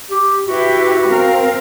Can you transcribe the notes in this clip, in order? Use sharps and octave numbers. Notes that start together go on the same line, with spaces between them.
G4
E4 F#4 G4 B4
C4 A#4 F5